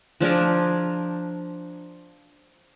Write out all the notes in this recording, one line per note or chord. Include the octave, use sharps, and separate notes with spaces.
F3 D4 G#4 A#4